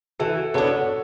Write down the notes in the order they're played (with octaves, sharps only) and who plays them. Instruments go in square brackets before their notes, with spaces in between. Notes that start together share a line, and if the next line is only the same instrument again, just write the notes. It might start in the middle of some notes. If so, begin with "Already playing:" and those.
[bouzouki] E3 [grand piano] F#4 A4
[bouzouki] B3 D4 [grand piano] A4 C#5